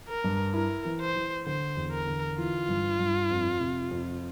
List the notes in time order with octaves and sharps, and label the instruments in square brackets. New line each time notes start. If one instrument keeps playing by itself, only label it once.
[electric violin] A#4
[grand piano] G2
[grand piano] E4 [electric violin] A#4
[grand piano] E3
[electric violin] C5
[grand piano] E3
[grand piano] D3 [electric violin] C5
[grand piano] E2
[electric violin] A#4
[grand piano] D3
[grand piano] E3 [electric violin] F4
[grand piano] G2
G2
F2
C3
F2